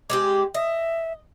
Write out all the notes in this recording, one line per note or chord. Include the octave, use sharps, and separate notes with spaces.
G#3 C4 G4 D6
D#5 E5